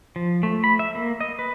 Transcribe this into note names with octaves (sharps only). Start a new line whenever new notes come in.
F3
A3
B5
E5
A#3
D#5
B4